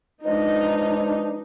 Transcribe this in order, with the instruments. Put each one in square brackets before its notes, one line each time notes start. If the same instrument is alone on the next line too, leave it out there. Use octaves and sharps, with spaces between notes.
[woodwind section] E3 F3 G#3 [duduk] D4 [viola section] D#4 [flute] D#5